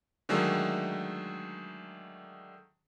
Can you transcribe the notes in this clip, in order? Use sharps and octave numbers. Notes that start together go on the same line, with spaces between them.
D3 D#3 F#3 G#3 A3